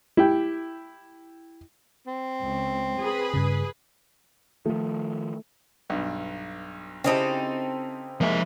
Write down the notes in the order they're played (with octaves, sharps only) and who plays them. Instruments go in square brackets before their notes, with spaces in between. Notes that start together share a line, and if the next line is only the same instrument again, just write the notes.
[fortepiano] E4 G4 G5
[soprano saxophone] C4
[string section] C#2
G#4 B4
[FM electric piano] G2 C#3
[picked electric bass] D#3 F3 [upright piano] A3
[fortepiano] B1 G2
[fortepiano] C#3 E4 G4 [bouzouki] C4 D#4 A4
[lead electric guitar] F3 E5 [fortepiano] G#3 A#3